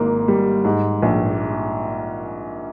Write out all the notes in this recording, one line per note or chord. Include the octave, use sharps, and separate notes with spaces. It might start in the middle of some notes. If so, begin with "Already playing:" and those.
Already playing: G#1 G#2 A#3
G3
G#2
A#1